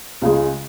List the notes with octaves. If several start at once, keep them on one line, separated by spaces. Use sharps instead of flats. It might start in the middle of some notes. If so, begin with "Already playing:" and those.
C#2 C#3 G#3